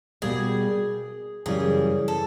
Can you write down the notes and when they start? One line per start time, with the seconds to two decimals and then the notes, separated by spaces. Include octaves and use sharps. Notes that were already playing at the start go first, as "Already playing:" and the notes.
0.22 B2 G3 A#3 G#4
1.46 F#2 C#3 E3 G3 G#4
2.08 A4